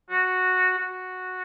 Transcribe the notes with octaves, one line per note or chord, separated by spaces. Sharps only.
F#4
F#4